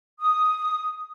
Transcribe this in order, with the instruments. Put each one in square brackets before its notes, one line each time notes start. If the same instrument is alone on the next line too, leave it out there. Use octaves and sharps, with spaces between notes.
[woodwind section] D#6